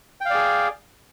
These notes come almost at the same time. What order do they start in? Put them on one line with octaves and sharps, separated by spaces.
G5 F5 D5 G#4